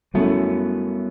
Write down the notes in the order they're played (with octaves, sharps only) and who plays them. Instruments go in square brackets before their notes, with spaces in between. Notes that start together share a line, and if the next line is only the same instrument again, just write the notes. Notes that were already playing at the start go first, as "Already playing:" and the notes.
[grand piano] F#2 F#3 A3 E4 [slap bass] G3 B3